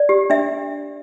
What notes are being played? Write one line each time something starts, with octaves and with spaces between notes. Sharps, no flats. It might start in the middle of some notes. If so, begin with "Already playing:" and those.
Already playing: D5
G4
D4 E5